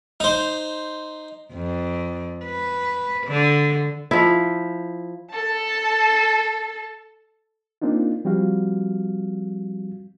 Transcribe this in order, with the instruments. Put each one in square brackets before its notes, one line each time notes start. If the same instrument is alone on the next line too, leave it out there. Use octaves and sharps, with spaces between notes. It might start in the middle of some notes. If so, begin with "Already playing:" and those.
[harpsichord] D#4 C5
[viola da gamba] F2
B4
D3
[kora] F3 E4
[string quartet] A4 A5
[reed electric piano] A#3 C4 D4 D#4 F4
F3 G3 C4 F#4 F5